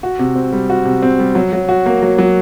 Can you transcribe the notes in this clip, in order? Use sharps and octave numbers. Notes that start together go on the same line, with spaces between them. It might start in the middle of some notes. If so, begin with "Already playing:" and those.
F#4
C3
C4
G3
F#4
C3
C4
G3
F#3
F#3
F#4
A#3
F#3
F#3